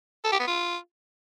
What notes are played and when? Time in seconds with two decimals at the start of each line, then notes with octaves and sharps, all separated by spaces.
0.25 A4
0.32 G4
0.40 B3
0.47 F4